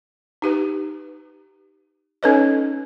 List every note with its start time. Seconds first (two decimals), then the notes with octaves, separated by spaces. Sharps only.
0.42 D#4 G4 B4
2.23 C#4 D#4 A4 B4 C#5 D#5